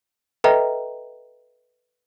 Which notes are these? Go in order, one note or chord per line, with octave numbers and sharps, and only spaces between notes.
A4 B4 D#5 E5 G5 A#5